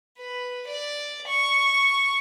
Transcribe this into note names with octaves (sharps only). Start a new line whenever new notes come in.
B4
D5
C#6